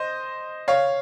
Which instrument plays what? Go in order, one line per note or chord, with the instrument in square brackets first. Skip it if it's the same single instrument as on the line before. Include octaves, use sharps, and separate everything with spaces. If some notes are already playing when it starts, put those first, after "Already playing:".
Already playing: [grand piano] C5 D#5
C#5 F5